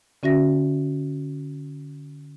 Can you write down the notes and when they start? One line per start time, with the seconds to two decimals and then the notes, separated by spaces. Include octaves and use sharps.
0.23 D3 C#4 F#4 E5 A#6